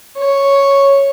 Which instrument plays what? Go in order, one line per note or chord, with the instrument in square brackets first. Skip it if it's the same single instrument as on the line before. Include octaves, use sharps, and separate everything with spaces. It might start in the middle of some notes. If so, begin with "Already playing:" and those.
[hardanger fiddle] C#5